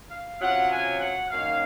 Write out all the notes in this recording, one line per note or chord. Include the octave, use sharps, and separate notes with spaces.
F5
C3 F#3 C#4 F4 F#5
G#5
F#5
F#2 D#3 F#3 A#3 C#4 F5